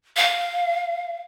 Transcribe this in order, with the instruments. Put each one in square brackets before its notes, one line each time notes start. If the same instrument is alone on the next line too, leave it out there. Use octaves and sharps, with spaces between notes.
[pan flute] F5